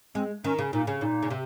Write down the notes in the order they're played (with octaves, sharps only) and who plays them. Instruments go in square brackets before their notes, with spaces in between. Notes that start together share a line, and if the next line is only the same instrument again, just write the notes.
[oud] G#3 [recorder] C4
[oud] D#3 [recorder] C#4
[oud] C#3
[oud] A#2 [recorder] D#4
[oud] C#3
[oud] A#2 [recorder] D#4
[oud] C#3
C3